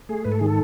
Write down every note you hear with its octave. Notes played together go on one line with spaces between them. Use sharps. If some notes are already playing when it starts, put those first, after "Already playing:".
A3 G#4
G#2 B4
A4
D#3 G#4
A4